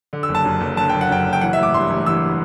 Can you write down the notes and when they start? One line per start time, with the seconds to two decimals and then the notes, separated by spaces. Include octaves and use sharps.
0.13 D3
0.23 E6
0.29 F#1
0.35 A5
0.45 F#2
0.61 F#1
0.77 D3 A5
0.89 F#1 G5
1.01 F#5
1.10 F#2 G5
1.26 F#1
1.33 G5
1.41 E3 F#5
1.53 E5
1.58 A1 D6
1.74 G2 C6
1.90 A1
2.06 E3 E6